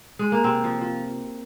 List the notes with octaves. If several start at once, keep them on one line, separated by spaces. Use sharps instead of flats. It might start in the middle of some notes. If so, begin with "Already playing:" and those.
G#3
A#3
C3 C4
F3
F3